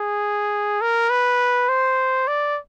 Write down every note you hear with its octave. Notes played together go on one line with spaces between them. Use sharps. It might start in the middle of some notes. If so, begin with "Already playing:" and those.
Already playing: G#4
A#4
B4
C5
D5